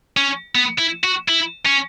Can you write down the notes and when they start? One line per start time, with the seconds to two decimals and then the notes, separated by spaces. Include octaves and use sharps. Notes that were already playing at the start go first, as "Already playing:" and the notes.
0.17 C#4
0.55 B3
0.79 E4
1.04 F#4
1.29 E4
1.66 C#4